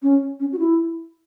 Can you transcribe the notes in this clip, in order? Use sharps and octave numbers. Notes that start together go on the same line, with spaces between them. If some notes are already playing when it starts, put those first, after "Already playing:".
C#4
C#4
F#4
E4